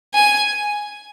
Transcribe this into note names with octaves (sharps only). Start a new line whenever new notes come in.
G#5